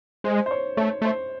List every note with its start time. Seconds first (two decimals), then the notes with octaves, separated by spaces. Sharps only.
0.24 G#3 C5
0.46 C5
0.51 C#5
0.77 A3 C#5
1.02 A3 C5